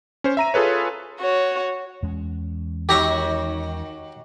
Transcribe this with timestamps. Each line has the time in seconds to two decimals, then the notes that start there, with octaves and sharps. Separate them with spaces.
0.24 C#4 C5
0.37 E5 A#5 D#7
0.54 F4 G#4 A4 B4 C#5
1.20 F#4 C#5
2.02 E2 G#3 C#4
2.89 D#3 F#4 G4 C#5 A#5 C#6